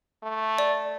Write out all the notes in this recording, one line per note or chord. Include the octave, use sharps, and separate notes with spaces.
A3
D5